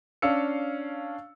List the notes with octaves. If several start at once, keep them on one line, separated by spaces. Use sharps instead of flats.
C#4 D4 F5 E6 C#7